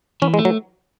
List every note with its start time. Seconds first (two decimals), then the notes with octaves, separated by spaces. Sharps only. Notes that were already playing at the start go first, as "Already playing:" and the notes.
0.22 E3 C#4
0.34 G#3
0.39 A3
0.45 F#3